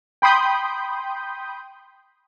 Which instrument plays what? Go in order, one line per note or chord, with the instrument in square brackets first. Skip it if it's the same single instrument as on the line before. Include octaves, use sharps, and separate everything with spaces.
[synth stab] G5 B5 C6 D#6 G6